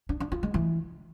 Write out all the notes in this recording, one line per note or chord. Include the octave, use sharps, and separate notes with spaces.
D4
D4
F4
G#3
E3